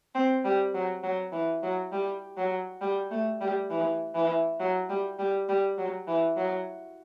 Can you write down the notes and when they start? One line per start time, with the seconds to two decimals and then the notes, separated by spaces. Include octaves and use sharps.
0.15 C4
0.45 G3
0.74 F#3
1.03 F#3
1.33 E3
1.63 F#3
1.92 G3
2.37 F#3
2.81 G3
3.11 A3
3.41 G3
3.70 E3
4.15 E3
4.60 F#3
4.90 G3
5.19 G3
5.49 G3
5.78 F#3
6.08 E3
6.37 F#3